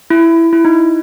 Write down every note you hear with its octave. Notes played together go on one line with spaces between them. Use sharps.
E4
E4
D#4